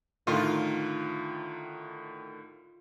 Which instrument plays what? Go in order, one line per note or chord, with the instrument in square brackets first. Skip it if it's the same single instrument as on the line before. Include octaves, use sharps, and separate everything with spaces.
[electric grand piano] A2 D3 D#3 [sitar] F4